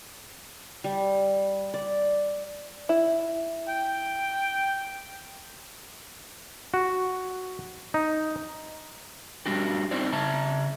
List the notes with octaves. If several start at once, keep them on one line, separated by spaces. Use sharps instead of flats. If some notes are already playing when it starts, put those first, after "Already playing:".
G3
D5
E4
G5
F#4
D#4
G3 D4 F#4 G4
C4 D#4 E4 C5 D5
C#3 E5 A5 A#5